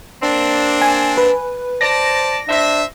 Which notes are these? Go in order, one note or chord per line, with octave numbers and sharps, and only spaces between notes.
A#3 C4 D4
G#5
B4
C5 D5 A5 A#6
D4 C5 E5